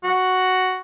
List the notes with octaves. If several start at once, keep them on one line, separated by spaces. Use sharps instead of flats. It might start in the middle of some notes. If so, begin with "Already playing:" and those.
F#4